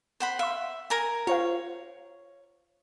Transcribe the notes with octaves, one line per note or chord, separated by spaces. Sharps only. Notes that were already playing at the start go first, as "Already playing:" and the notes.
C5 F#5 B5
E5 F5 C6
A#4 G#5 A#5
F4 C5 C#5 F5